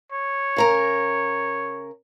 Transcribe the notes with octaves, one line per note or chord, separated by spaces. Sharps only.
C#5
C#3 A#4 A#5